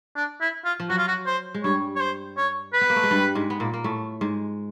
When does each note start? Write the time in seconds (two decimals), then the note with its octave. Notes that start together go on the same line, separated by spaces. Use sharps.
0.17 D4
0.41 E4
0.65 F4
0.80 F3
0.90 F#3 F#4
0.98 F4
1.08 F#4
1.27 C5
1.54 G#3
1.64 G2 G3 C#5
1.96 C#5
2.01 C5
2.37 C#5
2.74 B4
2.81 B3
2.90 A#3
2.96 A3
3.03 G#3
3.11 G2 G3
3.35 G#2 G#3
3.50 B3
3.60 A#2 A#3
3.74 A#3
3.84 A2 A3
4.21 G#2 G#3